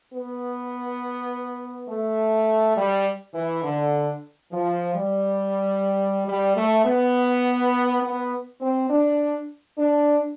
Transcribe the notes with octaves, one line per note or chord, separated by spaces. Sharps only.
B3
A3
G3
E3
D3
F3
G3
G3
A3
B3
B3
C4
D4
D4